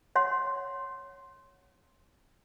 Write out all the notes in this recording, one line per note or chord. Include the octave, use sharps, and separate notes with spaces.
C#5 F#5 C6